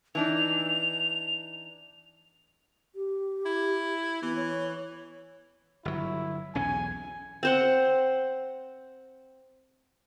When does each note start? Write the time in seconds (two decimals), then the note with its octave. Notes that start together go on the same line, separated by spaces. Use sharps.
0.15 E3 D4 D#4 F7
2.95 G4
3.46 E4
4.22 E3 B3
4.36 C#5
5.85 G1 F#3 E4
6.55 B1 E2 C#4 G#5
7.43 C4 C5 F#5